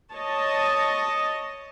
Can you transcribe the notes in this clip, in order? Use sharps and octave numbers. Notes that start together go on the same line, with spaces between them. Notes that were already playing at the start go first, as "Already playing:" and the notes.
C#5 D#5 A5